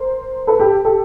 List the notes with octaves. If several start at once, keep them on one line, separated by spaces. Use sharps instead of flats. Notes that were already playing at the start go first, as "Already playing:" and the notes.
Already playing: A#4 C5
A4 B4
G4 A4
G4 A4